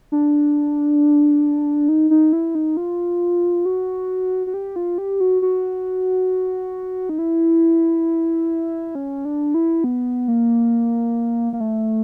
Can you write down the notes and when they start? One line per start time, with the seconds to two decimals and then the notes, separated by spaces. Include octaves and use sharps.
0.12 D4
1.88 D#4
2.10 D#4
2.33 E4
2.55 D#4
2.77 F4
3.66 F#4
4.47 F#4
4.54 G4
4.76 F4
4.98 G4
5.20 F#4
5.42 F#4
7.09 D#4
7.19 E4
8.95 C#4
9.25 D4
9.54 E4
9.84 B3
10.28 A#3
11.53 A#3
11.60 A3